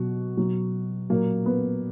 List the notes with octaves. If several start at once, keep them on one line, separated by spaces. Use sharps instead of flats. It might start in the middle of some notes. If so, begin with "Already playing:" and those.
Already playing: B2 F#3 F#4
B2 F#3
A#2 F#3 A#3
B3